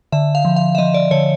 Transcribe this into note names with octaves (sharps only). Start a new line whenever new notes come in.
D3 E5
F5
F3
F5
E5
F3 D#5
D5
D3 C#5